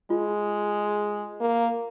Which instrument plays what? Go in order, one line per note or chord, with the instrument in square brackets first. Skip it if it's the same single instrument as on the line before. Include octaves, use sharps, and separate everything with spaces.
[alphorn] G#3 [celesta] F4
[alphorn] A#3